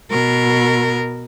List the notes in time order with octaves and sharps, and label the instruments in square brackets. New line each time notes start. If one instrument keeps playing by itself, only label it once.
[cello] B2 A#4